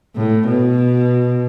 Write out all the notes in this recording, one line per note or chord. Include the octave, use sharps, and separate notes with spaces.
A2
B2